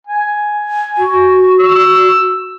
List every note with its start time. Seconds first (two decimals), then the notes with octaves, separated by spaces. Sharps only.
0.07 G#5
0.97 F#4
1.59 E6